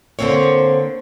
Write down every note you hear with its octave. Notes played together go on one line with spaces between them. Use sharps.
D3 A#3 C4 C5 C#5